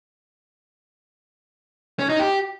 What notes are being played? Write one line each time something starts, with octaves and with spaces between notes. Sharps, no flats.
C#4
D#4
G4